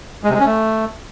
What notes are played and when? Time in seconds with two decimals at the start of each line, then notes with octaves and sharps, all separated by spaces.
0.24 G#3
0.29 C3
0.35 G#3
0.40 C#4
0.45 A3